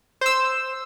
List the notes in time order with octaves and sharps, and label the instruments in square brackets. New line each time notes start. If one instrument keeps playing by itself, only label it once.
[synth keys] C5 E6